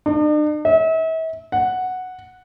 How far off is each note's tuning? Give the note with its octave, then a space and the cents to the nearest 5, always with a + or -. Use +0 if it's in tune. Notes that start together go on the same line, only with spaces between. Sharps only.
D4 +45
E5 -40
F#5 -5